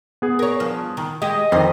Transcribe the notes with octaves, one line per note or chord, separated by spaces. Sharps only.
B3 G#4
A#4 C#5
G2 F3
D#3
G#3 G4 D#5
F2 D#3 C5 F5